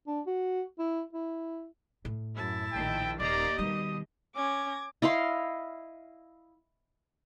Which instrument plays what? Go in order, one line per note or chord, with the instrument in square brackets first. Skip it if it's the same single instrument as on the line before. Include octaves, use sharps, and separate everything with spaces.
[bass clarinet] D4
F#4
E4
E4
[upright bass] A2
[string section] F#2 [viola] E4 A5
[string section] A#1 D#3 [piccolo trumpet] G5
[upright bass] D#1 [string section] D#2 A#3 A#5 [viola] G4 D#5 [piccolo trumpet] D5
[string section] B2 [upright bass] D#3 G3 [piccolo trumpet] D#6
[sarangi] C#4 [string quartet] D6 G#6 A#6
[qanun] E4 D#5 F5 C6